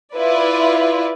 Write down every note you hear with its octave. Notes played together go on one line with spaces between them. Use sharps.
E4 F4 B4 D5